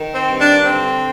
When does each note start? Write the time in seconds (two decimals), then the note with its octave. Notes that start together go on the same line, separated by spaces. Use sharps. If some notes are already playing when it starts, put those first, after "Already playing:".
Already playing: D#3
0.14 C4
0.27 G2
0.40 D4
0.65 D3 C4